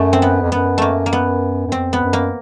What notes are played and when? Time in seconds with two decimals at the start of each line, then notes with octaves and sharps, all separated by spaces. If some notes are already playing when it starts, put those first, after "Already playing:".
Already playing: F#2 A3
0.13 C4
0.22 B3
0.41 F2
0.52 F#2 B3
0.78 A3 A#3
1.06 A#3
1.13 B3
1.67 F#2
1.72 F2 C4
1.93 B3
2.03 F#2
2.13 A#3